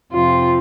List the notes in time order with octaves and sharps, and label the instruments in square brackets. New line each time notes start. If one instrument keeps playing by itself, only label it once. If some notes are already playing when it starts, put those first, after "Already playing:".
[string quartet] F2 C3 F3 F4